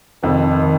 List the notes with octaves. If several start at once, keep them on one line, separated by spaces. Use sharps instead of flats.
F1 F2 D#3
D#3